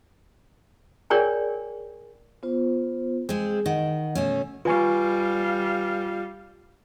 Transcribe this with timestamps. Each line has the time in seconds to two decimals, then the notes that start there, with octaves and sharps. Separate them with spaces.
1.10 G#4 A#4 C#5 D5 G5 G#5
2.43 B3 F4 C5
3.29 G#3 C4 G#4
3.66 D#3 D#5 F#5
4.15 B2 A3 C#4
4.65 G3 F4 B4 F5 G#5 C#6